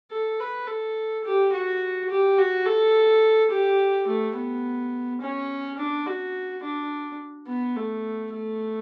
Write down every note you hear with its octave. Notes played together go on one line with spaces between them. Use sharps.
A4
B4
A4
G4
F#4
G4
F#4
A4
G4
A3
B3
C#4
D4
F#4
D4
B3
A3
A3